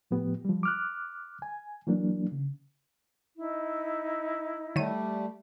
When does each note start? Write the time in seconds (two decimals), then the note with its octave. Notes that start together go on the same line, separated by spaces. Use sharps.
0.11 A2 F3 B3 G4
0.45 F3 G3
0.63 D6 F6 F#6
1.42 G#5
1.87 E3 F#3 A#3 D4
2.31 C#3
3.38 D#4 E4
4.76 D#3 G3 A3 C#5 D#7